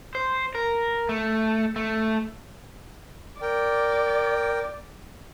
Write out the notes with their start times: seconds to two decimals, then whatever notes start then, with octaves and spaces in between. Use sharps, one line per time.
0.15 C5
0.55 A#4
1.09 A3
1.76 A3
3.42 A#4 D5 G5